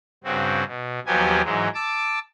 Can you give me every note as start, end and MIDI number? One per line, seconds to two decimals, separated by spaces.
0.24 0.64 43
0.24 0.64 49
0.24 0.64 60
0.24 0.64 66
0.66 0.99 47
1.06 1.42 39
1.06 1.42 53
1.06 1.42 54
1.06 1.42 59
1.06 1.42 67
1.06 1.42 80
1.44 1.68 44
1.44 1.68 52
1.44 1.68 54
1.44 1.68 56
1.74 2.19 81
1.74 2.19 86
1.74 2.19 88